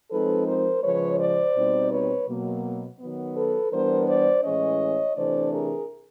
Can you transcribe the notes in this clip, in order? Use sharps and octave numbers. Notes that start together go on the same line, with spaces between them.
F3 G#3 C4 D#4 A4 B4
A#4 C5
C#3 F3 G#3 B4 C#5
C5 D5
B2 G3 C4 D#4
B4 C#5
B2 F#3 A#3
D#3 F#3 B3
A4 B4
E3 G3 B3 D4 A#4 C5
C5 D5
A2 E3 G#3 C#4 C#5 D#5
C3 E3 A3 D4 C5 D5
G#4 A#4